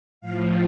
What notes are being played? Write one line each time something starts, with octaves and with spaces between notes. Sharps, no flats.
A2 F3 F5